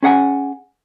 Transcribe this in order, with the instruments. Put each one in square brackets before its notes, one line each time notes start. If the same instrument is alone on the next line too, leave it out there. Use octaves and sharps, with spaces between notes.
[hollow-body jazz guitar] C#4 G#4 F#5 G#5